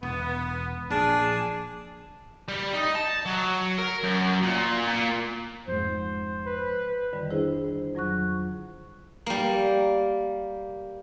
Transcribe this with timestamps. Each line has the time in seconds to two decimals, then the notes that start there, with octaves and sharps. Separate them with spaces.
0.03 E1 B3
0.90 A#1 D4 G#4
2.48 G3
2.74 D#4
2.95 A5
3.26 F#3
3.78 A#4
4.03 F#2
4.42 A#2
4.87 A#2
5.68 F2 G#2 C5
6.46 B4
7.13 F2 D3 D#3 G3
7.31 D4 E4 G#4 C5
7.64 C5
7.95 F2 F#3 C#6 F#6
9.26 G3 A#3